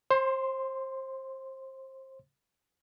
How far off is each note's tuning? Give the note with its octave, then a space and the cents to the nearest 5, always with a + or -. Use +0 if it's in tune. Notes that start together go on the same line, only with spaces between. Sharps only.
C5 +25 C6 -5